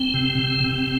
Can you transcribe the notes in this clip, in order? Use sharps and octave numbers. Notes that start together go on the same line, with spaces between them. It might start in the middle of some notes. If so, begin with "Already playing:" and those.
Already playing: C4
C3
C3
C3